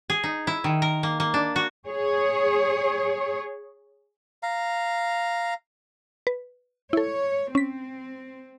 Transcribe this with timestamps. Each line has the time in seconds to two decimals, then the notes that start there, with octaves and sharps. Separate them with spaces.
0.10 G#4
0.24 D#4
0.47 E4
0.64 D#3
0.82 A#4
1.03 A#3
1.20 A#3
1.34 D4
1.56 F#4
1.87 G#4 C#5
4.43 F5 A#5
6.27 B4
6.93 E4 A4 C#5
7.55 C4 C#4 B6